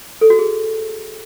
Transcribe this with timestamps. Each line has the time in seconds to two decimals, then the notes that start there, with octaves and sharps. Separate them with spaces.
0.21 A4
0.30 F#4
0.39 G#4